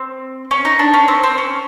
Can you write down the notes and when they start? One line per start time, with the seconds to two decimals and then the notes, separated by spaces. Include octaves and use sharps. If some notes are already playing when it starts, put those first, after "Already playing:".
Already playing: C4
0.51 C#4
0.65 D#4
0.79 D4
0.94 C#4
1.08 C4
1.23 C4
1.38 C#4